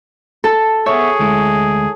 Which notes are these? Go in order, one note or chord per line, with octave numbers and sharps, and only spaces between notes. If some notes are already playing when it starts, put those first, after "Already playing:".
A4
B3 G#4 C#5 E5
D2 G#3 E4